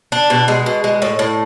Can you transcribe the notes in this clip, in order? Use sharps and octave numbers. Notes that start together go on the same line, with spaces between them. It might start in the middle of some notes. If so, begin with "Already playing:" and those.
D4
B2
G#3
B2
G#3
A2
A2